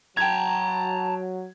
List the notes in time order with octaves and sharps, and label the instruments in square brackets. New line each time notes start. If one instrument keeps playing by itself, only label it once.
[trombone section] F#3 [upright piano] G5 G#6 [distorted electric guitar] A5 A#5